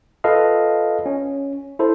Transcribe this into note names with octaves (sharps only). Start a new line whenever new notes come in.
F4 A4 B4 D#5 F5
C#4
E4 A4 C5